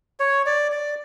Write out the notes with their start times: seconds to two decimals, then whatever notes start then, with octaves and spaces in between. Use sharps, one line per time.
0.20 C#5
0.46 D5
0.72 D5